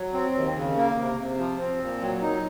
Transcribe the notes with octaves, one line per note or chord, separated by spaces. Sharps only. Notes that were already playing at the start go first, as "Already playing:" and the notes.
Already playing: F#3
C4
D#2
C#3
A#3
C3
C3
F3
C4
A#2
F#3
D#4